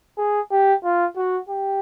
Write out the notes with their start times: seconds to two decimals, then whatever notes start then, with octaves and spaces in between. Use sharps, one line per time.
0.18 G#4
0.51 G4
0.84 F4
1.16 F#4
1.49 G4